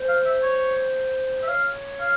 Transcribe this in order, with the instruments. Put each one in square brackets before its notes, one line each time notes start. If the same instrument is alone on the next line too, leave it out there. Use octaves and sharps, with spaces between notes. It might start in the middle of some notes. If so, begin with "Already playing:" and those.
Already playing: [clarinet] C5
[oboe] F5
E5
C#5
E5
[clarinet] C#5 [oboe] F5
[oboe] F5